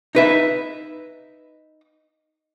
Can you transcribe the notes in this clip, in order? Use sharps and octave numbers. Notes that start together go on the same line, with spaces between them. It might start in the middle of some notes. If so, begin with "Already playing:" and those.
D#4 B4 E5